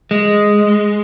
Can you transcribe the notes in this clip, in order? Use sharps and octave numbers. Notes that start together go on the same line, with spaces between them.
G#3